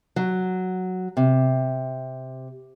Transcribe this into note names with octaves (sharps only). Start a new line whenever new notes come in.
F#3
C3